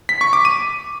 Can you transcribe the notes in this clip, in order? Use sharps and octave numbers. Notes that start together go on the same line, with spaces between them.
B6
C#6
D6
D#7